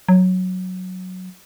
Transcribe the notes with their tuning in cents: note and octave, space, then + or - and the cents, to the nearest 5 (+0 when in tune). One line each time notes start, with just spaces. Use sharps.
F#3 -5